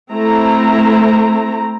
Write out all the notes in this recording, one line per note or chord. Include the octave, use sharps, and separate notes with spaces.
A3 C4 E4 A#5